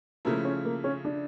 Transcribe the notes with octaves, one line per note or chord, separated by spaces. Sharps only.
C#3 F3 A3 A#3 E4
C#4
A#3
C#4
D4